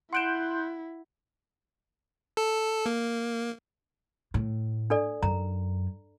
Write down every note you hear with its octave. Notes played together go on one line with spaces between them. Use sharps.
E4 F#5 C6 F#6 G6 D7 E7
A4
A#3
A2
D4 A4 D5
F#2 A#5